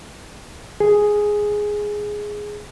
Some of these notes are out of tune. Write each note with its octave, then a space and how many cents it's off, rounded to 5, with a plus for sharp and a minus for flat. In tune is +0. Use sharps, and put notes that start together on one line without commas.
G#4 +0